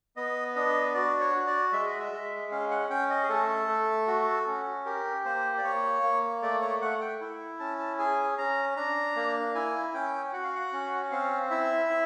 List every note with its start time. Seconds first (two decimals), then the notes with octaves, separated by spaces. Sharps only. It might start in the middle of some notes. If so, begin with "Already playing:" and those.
0.16 B3 D#5
0.56 D4 D#5
0.94 F#4 D5
1.21 C#5
1.34 F#4
1.47 D5
1.73 G#3 E5
1.86 D#5
1.99 E5
2.12 G#3
2.51 C#4 F5
2.71 F#5
2.90 C#4 G5
3.10 D#5
3.23 G#4
3.29 A3 A4
3.68 A3
4.08 F#4
4.47 C#4
4.86 G4 A#4
5.25 A#3 C5
5.58 D5
5.64 A#3 C#5
6.03 A#3
6.42 A3 D5
6.61 C#5
6.81 A3 F#5
7.01 G5
7.20 E4
7.60 C#4 A5
7.79 A5
7.99 G#4 G#5
8.38 C#4 A#5
8.77 D4 A#5
9.16 A#3
9.55 E4 G#5
9.94 C#4 G5
10.33 F#4 F#5
10.44 F5
10.55 F#5
10.72 C#4
11.11 C4 F5
11.51 E4 E5
11.90 E4